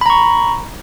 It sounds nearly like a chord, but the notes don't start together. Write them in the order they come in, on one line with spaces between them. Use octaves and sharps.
B5 A#5 C#6